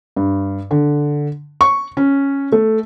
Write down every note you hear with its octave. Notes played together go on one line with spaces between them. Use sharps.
G2
D3
C#6
C#4
A3